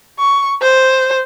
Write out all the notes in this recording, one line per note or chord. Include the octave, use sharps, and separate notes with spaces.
C#6
C5